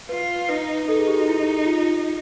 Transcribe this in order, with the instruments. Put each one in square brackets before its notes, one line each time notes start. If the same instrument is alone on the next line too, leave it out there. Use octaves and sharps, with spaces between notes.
[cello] F4 [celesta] B4
[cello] D#4 [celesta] B4
[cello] D#4 [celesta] A4
[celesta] G#4
G4
F#4
E4
F4